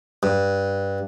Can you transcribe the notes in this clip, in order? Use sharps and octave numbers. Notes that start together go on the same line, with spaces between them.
G2